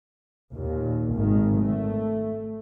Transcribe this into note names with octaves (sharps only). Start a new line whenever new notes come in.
D#2 A#2
G#1 D#3
A3